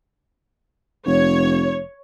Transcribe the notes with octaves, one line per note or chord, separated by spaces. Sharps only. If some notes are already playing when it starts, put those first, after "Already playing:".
F1 C#5